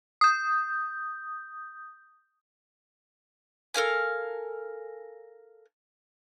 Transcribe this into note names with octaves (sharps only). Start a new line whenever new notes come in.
D#6 G6
A4 A#4 F5 G#5